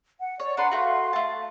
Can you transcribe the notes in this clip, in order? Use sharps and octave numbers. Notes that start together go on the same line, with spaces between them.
F#5
C#5 D5
D4 B4 F#5 A#5 C6
A3 F#4 F5 C6
A3 A5